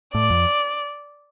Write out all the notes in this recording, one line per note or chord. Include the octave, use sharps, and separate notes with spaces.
A2 D5
F2